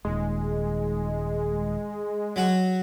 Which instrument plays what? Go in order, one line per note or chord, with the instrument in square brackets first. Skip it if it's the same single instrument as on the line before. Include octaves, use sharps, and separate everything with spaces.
[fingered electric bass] D#1 D#2 [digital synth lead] G#3
[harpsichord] F#3 F#4